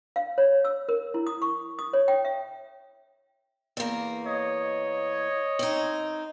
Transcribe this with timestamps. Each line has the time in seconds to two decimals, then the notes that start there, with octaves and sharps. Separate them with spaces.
0.16 F5
0.38 C#5
0.65 E6
0.89 A#4
1.14 E4
1.27 D#6
1.42 C#6
1.79 D#6
1.93 C#5
2.08 G5
2.25 E5
3.77 E2 A#3
4.25 C#5 D#5
5.59 C4 D#4